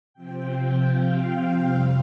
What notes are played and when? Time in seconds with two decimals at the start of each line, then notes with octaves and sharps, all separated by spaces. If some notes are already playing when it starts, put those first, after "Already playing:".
0.14 C3 F3 C4 G5
0.89 F5
1.63 F2 C3 G3 C4